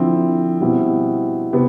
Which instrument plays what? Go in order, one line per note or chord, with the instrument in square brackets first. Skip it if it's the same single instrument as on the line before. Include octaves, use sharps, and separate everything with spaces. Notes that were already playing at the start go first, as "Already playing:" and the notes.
Already playing: [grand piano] D3 F3 C4 E4
B2 G3 C4 E4
C3 B3